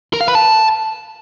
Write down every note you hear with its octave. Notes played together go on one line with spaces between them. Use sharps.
A#4
F5
B4
A5